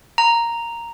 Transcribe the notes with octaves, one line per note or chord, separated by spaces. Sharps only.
A#5